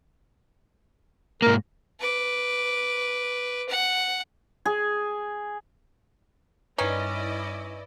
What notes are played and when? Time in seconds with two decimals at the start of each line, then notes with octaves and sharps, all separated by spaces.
1.42 G#2 A#3 A#4
2.00 B4 D6
3.68 F#5
4.65 G#4
6.78 G2 D#3 C#4 E4 B4 D5 D#5